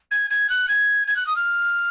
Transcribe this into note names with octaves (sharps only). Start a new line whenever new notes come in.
G#6
G#6
F#6
G#6
G#6
F#6
D#6
F6